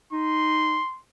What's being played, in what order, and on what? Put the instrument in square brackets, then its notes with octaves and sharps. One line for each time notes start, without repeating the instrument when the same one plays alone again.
[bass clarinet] D#4 [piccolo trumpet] C6